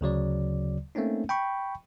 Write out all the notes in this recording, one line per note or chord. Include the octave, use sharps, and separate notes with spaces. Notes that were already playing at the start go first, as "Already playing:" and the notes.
D2 C#3 F#3 D5
A3 A#3 C4 C#4 D#4
G5 B5 C#6